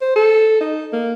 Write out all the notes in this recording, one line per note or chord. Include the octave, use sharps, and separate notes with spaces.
C5
A4
D#4
A#3